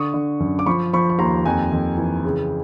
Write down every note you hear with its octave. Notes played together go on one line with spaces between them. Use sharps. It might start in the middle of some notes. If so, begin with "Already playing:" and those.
Already playing: D3 C#6 D#6
D3
F#2
D6
F3 B5 C#6
F3 B5 C#6
C#6
D#2 A#5 C6
F2 G#5 A#5
F2
E3
C#3